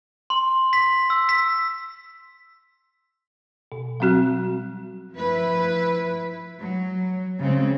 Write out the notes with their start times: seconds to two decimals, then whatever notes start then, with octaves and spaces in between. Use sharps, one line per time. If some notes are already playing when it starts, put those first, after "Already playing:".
0.30 C6
0.73 B6
1.10 E6
1.29 B6
3.72 B2
4.00 F#3 G3 C4 F#4 F#6
5.13 F3 E4 B4
6.58 F#3
7.38 C#3 F#3 G#3 C4